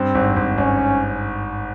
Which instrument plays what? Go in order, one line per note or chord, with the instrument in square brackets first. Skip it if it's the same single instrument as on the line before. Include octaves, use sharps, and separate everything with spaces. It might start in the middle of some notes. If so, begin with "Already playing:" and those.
Already playing: [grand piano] G2 [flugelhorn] C4
[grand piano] G#1
G#1
[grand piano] G#1 [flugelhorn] C#4